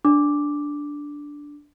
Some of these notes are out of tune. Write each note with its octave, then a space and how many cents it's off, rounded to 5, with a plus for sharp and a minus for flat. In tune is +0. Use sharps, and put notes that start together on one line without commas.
D4 -5 D6 +0